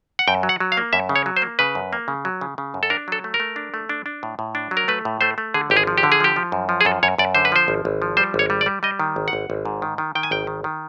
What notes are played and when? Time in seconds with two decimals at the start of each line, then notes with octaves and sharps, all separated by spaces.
0.19 F#5
0.28 F#2 G5
0.43 F#3
0.49 F#5
0.60 F#3
0.72 F5
0.77 A#3
0.93 F#2 E5
1.09 C#3
1.16 C#5
1.26 F#3
1.37 C5
1.42 A#3
1.59 C#3 B4
1.75 F#2
1.93 A#3
2.08 C#3
2.25 F#3
2.41 C#3
2.58 C#3
2.74 F#2
2.83 A4
2.90 D4 A#4
3.08 F#3 A4
3.24 A3
3.34 A#4
3.40 A3
3.56 D4
3.74 A3
3.89 D4
4.06 D4
4.23 A2
4.39 A2
4.55 D4
4.71 F#3
4.77 A#4
4.88 A3 B4
5.05 A2
5.21 A3 C5
5.38 A3
5.54 D3 G#4
5.70 G#1 G4
5.76 G#4
5.87 F3
5.98 G4
6.03 D3
6.12 G#4
6.20 F3 G4
6.36 F3
6.52 F#2
6.69 F3
6.81 G#4
6.85 F#2 A4
7.03 F#2 C#5
7.18 F#2 D5
7.35 D3 C5
7.45 B4
7.52 F3 C5
7.68 G#1
7.85 G#1
8.02 F3
8.17 G3 C5
8.34 G#1
8.39 C#5
8.50 G3
8.61 D5
8.66 G3
8.83 G3 D#5
9.00 D#3
9.16 G#1
9.28 F#5
9.33 G#1
9.50 G#1
9.65 G#2
9.82 D#3
9.98 D#3
10.15 D#3 G5
10.23 G#5
10.31 G#1 G5
10.47 D#3
10.64 D#3